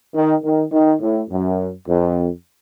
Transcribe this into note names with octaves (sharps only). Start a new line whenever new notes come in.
D#3
D#3
D#3
A2
F#2
F2